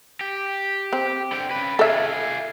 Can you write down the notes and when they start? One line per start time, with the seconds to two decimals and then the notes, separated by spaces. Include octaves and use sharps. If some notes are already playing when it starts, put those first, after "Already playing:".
0.21 G4
0.93 C4
1.32 D3 G5
1.51 C#3 B4
1.79 F4 G#4 A4 E5